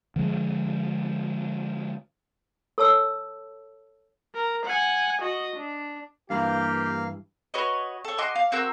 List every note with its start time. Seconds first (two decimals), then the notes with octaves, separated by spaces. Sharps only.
0.16 D3 F3 G#3
2.78 A4 C#5 A5 E6
4.34 A#4
4.66 F#5 G#5
5.21 F#4 D#5
5.56 D4
6.30 G2 E3 A#3 G4 F5
7.54 F#4 B4 C#5 D#5
8.04 A4 C#5
8.18 F#4 D#5 C6 D6
8.36 F5
8.52 C4 F#4 A#4 E6